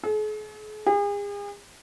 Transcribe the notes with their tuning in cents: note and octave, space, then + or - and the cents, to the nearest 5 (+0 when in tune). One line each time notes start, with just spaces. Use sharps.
G#4 +45
G#4 -40